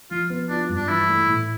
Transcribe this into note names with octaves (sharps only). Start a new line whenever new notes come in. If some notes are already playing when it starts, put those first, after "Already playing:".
F3 F4
B3
D4 F4
G2
D4
E3 E4
A3
A2